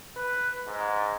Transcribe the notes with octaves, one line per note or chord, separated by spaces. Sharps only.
B4
G#2